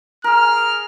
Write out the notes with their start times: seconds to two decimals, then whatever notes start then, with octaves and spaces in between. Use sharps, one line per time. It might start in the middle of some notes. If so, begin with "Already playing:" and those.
0.24 G#4 A#4 F6